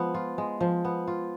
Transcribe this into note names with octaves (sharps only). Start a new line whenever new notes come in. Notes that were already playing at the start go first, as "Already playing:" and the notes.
Already playing: F3 G#3 B3
F4
G#3
F3
B3
F4